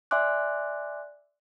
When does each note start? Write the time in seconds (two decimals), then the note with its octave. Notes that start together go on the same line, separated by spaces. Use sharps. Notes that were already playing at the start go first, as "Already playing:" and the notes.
0.11 D5 E5 G#5 C6 D6 F#6